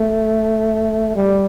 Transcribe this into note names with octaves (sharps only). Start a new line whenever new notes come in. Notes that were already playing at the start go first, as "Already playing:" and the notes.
Already playing: A3
G3